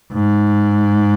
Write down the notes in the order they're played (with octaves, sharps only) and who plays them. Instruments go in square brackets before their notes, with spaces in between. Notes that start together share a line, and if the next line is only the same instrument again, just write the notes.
[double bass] G#2